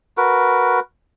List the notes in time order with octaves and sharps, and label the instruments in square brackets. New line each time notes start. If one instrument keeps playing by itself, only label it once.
[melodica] F#4 A#4 B4